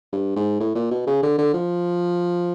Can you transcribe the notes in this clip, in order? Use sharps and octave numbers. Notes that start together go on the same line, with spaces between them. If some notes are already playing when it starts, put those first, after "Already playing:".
G2
G#2
A2
A#2
B2
C#3
D3
D3
F3